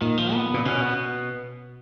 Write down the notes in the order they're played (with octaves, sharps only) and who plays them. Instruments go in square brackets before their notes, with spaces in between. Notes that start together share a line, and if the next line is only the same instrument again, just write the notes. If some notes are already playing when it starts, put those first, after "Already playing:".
[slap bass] A#2 [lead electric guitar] D#3
[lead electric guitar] F3
B3
[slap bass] A#2
[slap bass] B2 [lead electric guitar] C#4
[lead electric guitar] B3